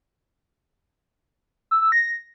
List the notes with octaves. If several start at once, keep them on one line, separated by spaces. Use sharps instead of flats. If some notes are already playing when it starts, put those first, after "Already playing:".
E6
E6
A#6